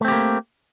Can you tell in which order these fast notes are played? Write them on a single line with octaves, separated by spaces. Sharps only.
A3 C4 G4 A#3